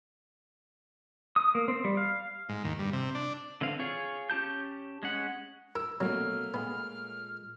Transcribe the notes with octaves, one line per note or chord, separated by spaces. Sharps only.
D#6
A#3
C4
G3
F5
G#2
D#2
G2
C3
D4
D3 E3 C4 F5
F4 G#4 C#5
C#4 G4 A5 G6
G#3 C#4 F#5
A#4 E6
B2 F#3 A3 A#3 C#4 F6
A#2 G#3 B3